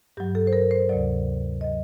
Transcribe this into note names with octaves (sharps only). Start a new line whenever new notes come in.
G2 F#3 G4
A4
C5
A#4
C5
D2 C3 F#3 D5
F#3 D#5